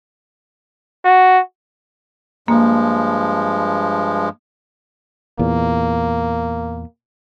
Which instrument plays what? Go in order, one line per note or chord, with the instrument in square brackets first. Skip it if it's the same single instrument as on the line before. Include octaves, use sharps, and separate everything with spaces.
[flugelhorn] F#4
[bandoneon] G2 F3 G#3 [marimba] A#3
[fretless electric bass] E2 A#2 [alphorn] A#3